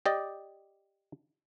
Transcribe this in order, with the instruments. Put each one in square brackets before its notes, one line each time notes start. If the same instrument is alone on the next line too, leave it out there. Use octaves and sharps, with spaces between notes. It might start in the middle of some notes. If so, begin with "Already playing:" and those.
[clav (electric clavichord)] G4 D5 D#5